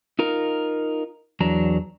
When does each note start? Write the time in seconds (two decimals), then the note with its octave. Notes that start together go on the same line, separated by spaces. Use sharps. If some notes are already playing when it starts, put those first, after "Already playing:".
0.19 D#4 F4 A#4
1.40 E2 F#3 D4 A#5